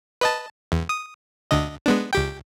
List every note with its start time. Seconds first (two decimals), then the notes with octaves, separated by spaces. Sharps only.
0.21 B4 D#5 A5
0.72 E2
0.89 D#6
1.51 D2 D3 D#5
1.86 G#3 B3 D4
2.13 C#2 G4 G5